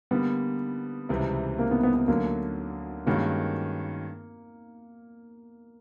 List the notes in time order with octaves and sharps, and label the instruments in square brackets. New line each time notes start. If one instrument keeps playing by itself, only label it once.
[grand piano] D3 G3 A#3 [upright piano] B3
[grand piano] C#2 C3 E3 G3 C4
[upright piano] A#3
B3
B3
B3
[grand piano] D2 D3 F#3 [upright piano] A#3
[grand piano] G2 D#3 G#3 C#4 F#4 [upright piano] A#3